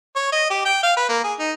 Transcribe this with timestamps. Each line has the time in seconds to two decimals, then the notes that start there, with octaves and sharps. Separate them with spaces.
0.16 C#5
0.32 D#5
0.50 G4
0.65 G5
0.83 F5
0.97 B4
1.09 A#3
1.24 G#4
1.39 D#4